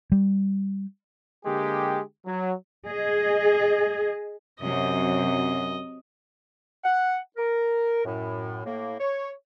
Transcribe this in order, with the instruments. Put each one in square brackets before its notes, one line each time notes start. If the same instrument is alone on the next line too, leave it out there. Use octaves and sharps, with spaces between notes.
[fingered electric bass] G3
[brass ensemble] D3 G#3 A#3 G4
F#3
[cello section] G#4 D#5
[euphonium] F#2 [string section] C3 F#3 [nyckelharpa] D#5
[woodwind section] F#5
A#4
F#2 A2
A2 A#3
C#5